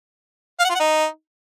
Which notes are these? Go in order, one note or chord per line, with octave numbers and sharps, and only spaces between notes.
F5
F#5
F4
F#5
D#4